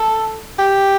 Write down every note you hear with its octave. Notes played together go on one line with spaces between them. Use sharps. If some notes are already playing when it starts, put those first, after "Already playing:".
Already playing: A4
G4